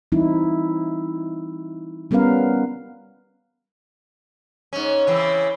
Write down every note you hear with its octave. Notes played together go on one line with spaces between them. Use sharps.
E3 G3 C4 D#4 E4
G3 B3 C#4 A#4 B4 F5
G#2 C#4
C#3 E3 C4